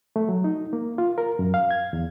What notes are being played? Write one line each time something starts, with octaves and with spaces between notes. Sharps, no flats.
A3
F#3
D#4
A#3
F4
A#4
F#2
F5
G#6
E2